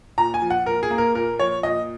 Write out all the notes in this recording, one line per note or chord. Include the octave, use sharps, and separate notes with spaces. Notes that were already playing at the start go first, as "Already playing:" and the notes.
A#2 A#5
G#5
F3
F#5
A#2 A#4
G#4
A#3
A#4
A#2 A#4
F3 C#5
A#2 D#5